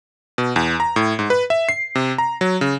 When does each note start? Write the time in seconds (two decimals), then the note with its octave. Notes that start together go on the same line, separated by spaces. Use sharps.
0.38 B2
0.56 E2
0.80 A#5
0.96 A2
1.19 G#2
1.30 B4
1.50 E5
1.69 C7
1.95 C3
2.18 A#5
2.41 F#3
2.61 C#3